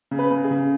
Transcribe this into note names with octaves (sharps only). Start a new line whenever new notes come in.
C#3
B4
C#3
G#4
C#3